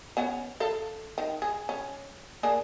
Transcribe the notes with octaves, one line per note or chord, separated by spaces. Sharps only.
B3 C#4 F#5
A4 F5
D#3
G#4
C#4
A#3 D4 G#4